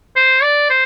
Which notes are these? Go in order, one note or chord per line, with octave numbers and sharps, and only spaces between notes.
C5
D5
C5